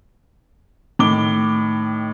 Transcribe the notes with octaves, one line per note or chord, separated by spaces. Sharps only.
A2 D#3 D6 G7